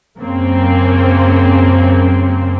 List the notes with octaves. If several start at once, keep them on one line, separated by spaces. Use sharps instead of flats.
F#2 C#3 A#3 C4